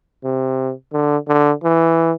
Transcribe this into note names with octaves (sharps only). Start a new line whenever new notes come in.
C3
D3
D3
E3